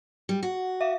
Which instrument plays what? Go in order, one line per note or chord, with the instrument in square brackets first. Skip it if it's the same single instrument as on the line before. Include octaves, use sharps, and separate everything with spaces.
[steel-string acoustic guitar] G3
F#4
[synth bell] E5 F5